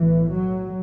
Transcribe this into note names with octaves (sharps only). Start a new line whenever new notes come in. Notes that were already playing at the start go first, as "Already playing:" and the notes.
Already playing: B1 A2 E3
F#3